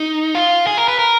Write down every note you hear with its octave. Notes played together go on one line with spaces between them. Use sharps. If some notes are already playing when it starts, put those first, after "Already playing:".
Already playing: D#4
F4
G#4
A#4
B4
A#4